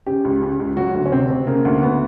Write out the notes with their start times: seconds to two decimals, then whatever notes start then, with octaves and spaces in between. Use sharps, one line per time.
0.06 C#3 G4
0.25 C#2
0.42 C#3
0.60 C#2
0.77 F#3 F#4
0.94 D2
1.06 C#4
1.12 C3 C4
1.30 C3
1.47 C#3 A#3
1.65 D2
1.82 D2 B3